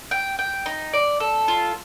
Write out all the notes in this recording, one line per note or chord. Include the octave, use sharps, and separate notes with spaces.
G5
G5
D#4
D5
A4
F4